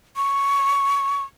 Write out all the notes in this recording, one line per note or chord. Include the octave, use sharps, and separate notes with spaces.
C#6